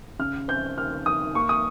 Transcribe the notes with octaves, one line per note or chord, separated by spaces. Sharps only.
C#3 F6
C4 G6
D#2 F6
D#2 D#6
A#3 C#6
D#6